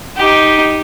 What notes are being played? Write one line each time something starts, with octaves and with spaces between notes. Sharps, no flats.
D#4 G4